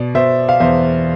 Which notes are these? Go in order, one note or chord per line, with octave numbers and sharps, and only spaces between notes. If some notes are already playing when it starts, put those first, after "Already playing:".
Already playing: B2 D5
B2 C5 E5
F5
E2 C5 E5